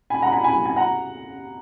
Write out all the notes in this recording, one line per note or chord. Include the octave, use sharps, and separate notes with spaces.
G#5 B5
F#5 A#5
G#5 B5
G#5 B5
G#5
F#5 A#5